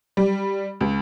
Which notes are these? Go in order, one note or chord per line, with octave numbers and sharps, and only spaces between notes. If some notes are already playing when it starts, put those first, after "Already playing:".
G3
C#2